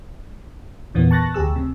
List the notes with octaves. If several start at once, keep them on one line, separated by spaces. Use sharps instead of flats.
E2 A#2 E3 A#3 B3
A5 C#6 F#6 A6 A#6
D2 G4 G#4 E6
C3